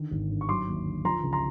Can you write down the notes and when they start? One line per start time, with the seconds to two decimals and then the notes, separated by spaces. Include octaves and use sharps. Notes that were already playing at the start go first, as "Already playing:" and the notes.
Already playing: D3 D#3
0.11 G#1
0.29 G2
0.41 C#6
0.49 F#3 C6 D6
0.67 D#2
0.85 D3
1.04 F3 A#5 C6
1.23 C#2
1.33 A#5 C6